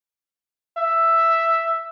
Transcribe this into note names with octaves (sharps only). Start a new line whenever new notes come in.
E5